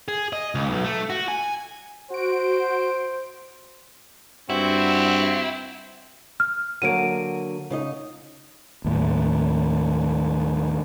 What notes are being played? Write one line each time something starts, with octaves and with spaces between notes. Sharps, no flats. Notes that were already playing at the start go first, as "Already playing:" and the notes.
G#4
D#5
C#2
B1
A3
F#4
G#5
F#4 C5 D7
G2 C4 E4 F#4
F6
D3 F#3 A#3 D7 D#7
C#3 D#4 D#5
D#2 A2